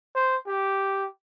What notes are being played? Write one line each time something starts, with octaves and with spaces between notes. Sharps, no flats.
C5
G4